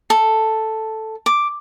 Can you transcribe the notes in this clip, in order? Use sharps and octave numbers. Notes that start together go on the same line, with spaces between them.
A4
D6